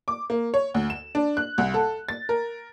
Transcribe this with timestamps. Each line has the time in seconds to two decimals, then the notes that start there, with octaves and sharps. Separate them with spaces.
0.08 D6
0.30 A#3
0.54 C#5
0.74 D2
0.90 E7
1.15 D4
1.37 F#6
1.58 C2
1.74 A4
2.09 A6
2.29 A#4